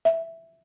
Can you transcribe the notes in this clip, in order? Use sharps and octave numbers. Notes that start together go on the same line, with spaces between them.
E5